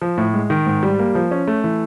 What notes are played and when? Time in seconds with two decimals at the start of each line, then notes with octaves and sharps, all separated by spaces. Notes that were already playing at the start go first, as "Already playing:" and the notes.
0.02 F3
0.18 A2
0.34 G#3
0.50 D#3
0.66 G#2
0.83 G3
0.99 A#3
1.15 F3
1.31 C#4
1.47 A3
1.64 E3